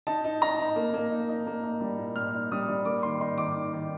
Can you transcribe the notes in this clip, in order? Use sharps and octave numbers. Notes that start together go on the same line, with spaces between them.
D#4 A5
D#4
D#4 A#5
D#4
A#3
A#3
D#4
D#4
A#3
D#4
G3
A#2
A#2 F6
D#4
G3 D#6
G3
A#3 D6
D#3 C6
D#4 C6
D#3 D6
D#3
D#3